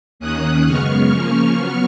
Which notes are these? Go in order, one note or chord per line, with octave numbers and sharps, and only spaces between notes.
D#2 D#3 A#3 C#4 D#6 F#6
F#2 C#3 G#3 B3 C#6 F6
C#3 F3 A#3 C#4
F#3 B3